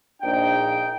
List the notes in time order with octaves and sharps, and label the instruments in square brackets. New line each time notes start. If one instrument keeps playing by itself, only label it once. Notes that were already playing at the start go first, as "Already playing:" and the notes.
[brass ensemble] A#1 D#4 G5